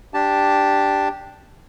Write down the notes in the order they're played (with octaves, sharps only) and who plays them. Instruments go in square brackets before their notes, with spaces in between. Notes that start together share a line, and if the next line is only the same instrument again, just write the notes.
[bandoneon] D4 G4 A5